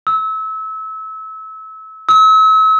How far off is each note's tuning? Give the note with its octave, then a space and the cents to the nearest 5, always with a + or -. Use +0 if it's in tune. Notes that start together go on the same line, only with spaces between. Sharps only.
E6 -30
E6 -40